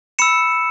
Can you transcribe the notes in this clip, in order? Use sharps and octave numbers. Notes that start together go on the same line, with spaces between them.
B5 E6 C#7 E7